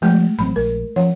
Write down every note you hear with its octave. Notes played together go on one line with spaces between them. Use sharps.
F3 G#3 A3 G4
A1 F#3 C4 B5
A#1 A#4
F3 C#4 C#5 F#5